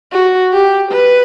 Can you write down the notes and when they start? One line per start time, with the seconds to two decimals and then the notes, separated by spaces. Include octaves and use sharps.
0.12 F#4
0.53 G4
0.91 B4